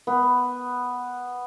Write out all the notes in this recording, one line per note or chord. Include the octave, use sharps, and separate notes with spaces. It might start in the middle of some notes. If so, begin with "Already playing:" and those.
B3